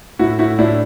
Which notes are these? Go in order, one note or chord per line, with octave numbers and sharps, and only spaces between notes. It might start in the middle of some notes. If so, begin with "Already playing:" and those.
A2 E4 F#4
A2 E4 F#4
A2 D4 E4